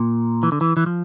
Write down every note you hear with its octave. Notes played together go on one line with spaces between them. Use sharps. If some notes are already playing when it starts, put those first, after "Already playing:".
Already playing: A#2
E3
D3
E3
E3
F3